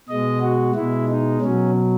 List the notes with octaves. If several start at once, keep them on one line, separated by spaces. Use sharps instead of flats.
B2 G#3 D#5
F#4
B2 G#3 E4
D#4
B2 F#3 C#4